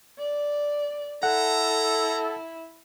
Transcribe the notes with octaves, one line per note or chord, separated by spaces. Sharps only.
D5
E4 A4 F#5 A#5